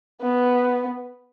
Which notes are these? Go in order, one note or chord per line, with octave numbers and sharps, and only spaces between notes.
B3